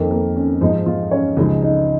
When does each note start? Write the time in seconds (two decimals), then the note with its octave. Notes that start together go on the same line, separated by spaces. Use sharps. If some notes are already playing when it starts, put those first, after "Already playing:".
Already playing: F2 D#3 A#3
0.10 A#3 A#4
0.36 C#4
0.61 G#2 F3 G#3 D#4
0.86 F3 F4
1.11 C#4 C#5
1.37 C#2 C#3 F3 G#3 D#4 D#5
1.62 D#4 D#5